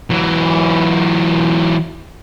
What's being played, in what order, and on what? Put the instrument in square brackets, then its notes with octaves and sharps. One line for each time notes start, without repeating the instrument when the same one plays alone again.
[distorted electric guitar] E3 F#3